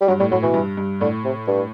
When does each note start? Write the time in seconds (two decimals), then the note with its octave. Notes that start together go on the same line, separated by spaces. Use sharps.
0.01 G3
0.08 G2 F#3
0.20 A2 G3
0.32 A2 F#3
0.43 B2 E3
0.54 G2
0.77 G2
1.01 A2 D3
1.25 C3
1.47 G2